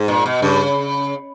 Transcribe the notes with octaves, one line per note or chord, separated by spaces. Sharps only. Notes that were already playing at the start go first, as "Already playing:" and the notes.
Already playing: G#2
A#2
B2
G2 C#3